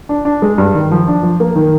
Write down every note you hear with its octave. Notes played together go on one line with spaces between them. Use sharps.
D4
D4
G#3
G2
D#3
F3
D4
F3
A#3
D#3